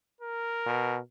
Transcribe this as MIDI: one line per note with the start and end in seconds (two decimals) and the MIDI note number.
0.21 1.00 70
0.66 0.98 47